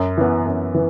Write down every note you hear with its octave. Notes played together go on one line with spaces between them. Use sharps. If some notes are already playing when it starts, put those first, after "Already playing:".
Already playing: F#2
E3 B3
F#2
E3